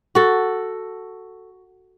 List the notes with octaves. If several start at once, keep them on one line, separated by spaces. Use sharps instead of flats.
F#4 A4